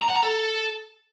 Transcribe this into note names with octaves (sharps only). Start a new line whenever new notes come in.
A#5
F#5
A#5
A4